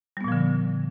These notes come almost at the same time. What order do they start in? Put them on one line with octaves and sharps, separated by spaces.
G3 B3 A#2 F3 D3